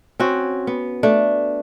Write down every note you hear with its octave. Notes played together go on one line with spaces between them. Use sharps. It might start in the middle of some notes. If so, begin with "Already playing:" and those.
C4 C#4 F#4
B3
A3 D4